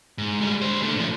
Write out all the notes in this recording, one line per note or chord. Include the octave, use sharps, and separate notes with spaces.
G#2
G3 G#3
D4 C5
A3 D4
A2 F3